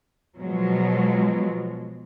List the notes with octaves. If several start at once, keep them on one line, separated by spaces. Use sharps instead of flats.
B2 F3 F#3 G#3